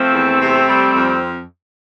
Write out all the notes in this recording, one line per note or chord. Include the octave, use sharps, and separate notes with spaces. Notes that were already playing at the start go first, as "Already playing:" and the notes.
Already playing: F3 A3 C4
E2
C3
G3
F2